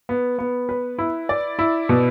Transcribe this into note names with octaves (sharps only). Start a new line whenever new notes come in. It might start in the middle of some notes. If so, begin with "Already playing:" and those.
B3
B3
B4
E4
D5
E4
B2